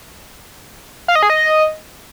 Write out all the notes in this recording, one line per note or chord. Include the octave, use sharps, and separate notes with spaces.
F5
D#5
G#4
D#5